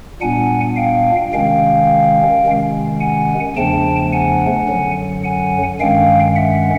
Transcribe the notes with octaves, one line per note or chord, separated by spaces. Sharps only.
A#2 G3 B3 D4 F#5 G#5
F5 G5
C3 D#3 G#3 C#4 F5 G5
C3 D#3 G#3 C#4
F#5 G#5
E2 C#3 F3 A3 D4 G5 A5
F#5 G#5
F#2 D3 F#3
F#5 G#5
G2 D#3 G#3 C#4 F5 G5
E5 F#5